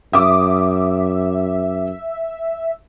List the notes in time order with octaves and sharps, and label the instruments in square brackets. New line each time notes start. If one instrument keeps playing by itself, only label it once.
[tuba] F#2 [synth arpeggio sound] E5 [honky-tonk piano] D6 D#6